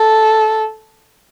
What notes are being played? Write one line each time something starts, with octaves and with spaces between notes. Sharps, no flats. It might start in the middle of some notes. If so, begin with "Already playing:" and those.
Already playing: A4